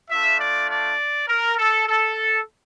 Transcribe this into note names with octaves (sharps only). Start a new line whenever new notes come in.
A3 D4 F4 E5
D5
D5
A#4
A4
A4